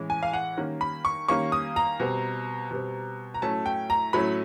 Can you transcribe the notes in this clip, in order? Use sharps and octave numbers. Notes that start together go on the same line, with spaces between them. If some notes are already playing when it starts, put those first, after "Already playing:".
Already playing: A2 E3 G#3 C#4
G#5
F5
F#5
D#3 G3 A#3 C#4
B5
C#6
D#3 G3 A#3 C#4 C#6
D#6
A#5
B2 G3 C4
B2 G3 C4
A#5
A2 F#3 A3 C#4 A5
G5
A#5
A2 F#3 A3 C#4 B5